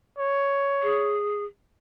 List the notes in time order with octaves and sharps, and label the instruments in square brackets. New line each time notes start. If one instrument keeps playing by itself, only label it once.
[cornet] C#5
[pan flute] G#4